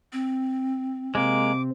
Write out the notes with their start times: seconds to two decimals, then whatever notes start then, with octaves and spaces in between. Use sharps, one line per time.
0.13 C4
1.15 C3 G#3 A#3 C4 D6